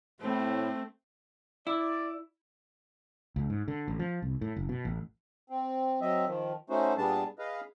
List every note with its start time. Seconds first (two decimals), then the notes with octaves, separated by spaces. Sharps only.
0.20 A2 A3 C4
1.67 E4 D5
3.36 C#2
3.50 G#2
3.68 D3
3.88 A1
3.99 F3
4.22 C2
4.41 A2
4.56 F#1
4.69 B2
4.85 A1
5.50 C4
6.01 F#3 C4 D#5 E5
6.26 D#3 F3
6.70 A3 C#4 D#4 F#4 C5
6.97 A#2 G3 B3 D4 G#4 A5
7.39 G#4 B4 D#5 F5